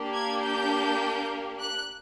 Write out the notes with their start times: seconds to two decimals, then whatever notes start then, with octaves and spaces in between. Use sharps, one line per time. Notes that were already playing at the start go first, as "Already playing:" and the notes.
Already playing: A#3 D4 G4
0.13 G#6
0.42 G6
1.59 F#6